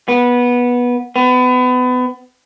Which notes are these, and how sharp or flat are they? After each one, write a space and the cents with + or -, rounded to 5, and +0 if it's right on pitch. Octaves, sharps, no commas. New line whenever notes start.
B3 -15
B3 +30